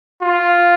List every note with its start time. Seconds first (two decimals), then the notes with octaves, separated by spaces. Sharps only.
0.22 F4